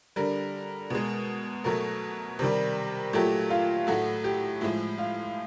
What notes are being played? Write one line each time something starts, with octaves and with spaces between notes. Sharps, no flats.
D3 G3 A#4
B2 G#3
B2 F#3 A3 A#4
C3 D#3 G3
A#2 F#3 A3 G4
F4
A2 F#3 A3 F#4
G4
A2 F3 G#3 E4
F4